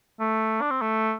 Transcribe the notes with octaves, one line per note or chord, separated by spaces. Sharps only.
A3
D4
C4
A3